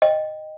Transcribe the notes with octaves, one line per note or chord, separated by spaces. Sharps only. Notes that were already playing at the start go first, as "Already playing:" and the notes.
D#5 G5